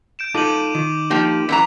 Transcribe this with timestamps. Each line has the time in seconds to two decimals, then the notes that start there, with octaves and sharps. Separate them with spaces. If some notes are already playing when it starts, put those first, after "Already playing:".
0.19 G6 D7 E7
0.35 D#4 F4 A4 D6 D#7 F#7
0.75 D#3
1.10 F3 A#3 D#4 G4
1.49 F#2 E3 A#5 B6 E7